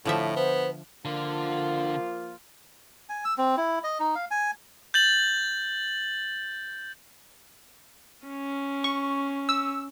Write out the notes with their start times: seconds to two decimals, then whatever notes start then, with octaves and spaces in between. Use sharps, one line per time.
0.05 A2 D3 F3 E5
0.37 B3 C5
1.05 D3 F3 A#3 F4
3.09 G#5
3.25 E6
3.38 C4
3.57 E4
3.84 D#5
4.00 D#4
4.15 F5
4.31 G#5
4.94 G6 A6 F#7
8.27 C#4
8.84 C#6
9.49 E6